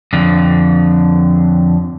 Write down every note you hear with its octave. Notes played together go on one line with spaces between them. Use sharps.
F2 D3